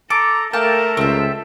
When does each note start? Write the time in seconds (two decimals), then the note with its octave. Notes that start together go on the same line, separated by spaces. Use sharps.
0.10 A4 A#5 D6
0.53 A3 A#3 A4 A#4 G5 A5
0.97 C#2 C4 E5